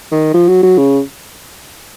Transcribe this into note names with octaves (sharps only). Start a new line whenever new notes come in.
D#3
F3
F#3
F#3
C#3